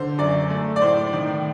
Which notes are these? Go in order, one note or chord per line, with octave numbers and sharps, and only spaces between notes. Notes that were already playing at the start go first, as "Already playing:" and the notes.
Already playing: D3 C5
F#2 D5
A3
D5
A2 C5
D#3